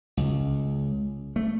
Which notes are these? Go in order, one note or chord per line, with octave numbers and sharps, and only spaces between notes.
C#2
A3